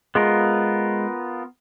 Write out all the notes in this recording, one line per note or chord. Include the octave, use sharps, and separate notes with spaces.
G#3 B3 F4 A#4